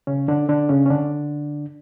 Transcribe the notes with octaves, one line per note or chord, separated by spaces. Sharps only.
C#3 C#4
D3 D4
D3 D4
C#3 C#4
C#4
D3 D4